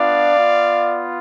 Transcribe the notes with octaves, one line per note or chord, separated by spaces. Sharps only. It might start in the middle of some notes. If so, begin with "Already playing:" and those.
Already playing: B3 D4 F4 D5 F5
B3 F4